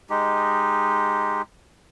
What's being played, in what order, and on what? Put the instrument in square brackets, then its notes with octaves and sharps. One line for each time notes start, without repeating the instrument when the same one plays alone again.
[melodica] G#3 D#4 G4